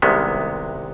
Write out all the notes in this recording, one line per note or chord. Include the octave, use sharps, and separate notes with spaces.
C2 C3 D#3 G#3 B3